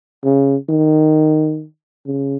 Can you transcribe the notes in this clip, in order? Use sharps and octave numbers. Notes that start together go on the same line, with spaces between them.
C#3
D#3
C#3